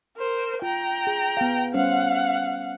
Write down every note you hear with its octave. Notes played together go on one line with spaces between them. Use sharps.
A#4 C5
F4 G5 A#5
G#4
B3 F5
G3 C#4 C5 F5 F#5